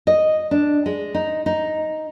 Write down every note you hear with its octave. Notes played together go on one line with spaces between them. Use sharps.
D#5
D4
G#3
D#4
D#4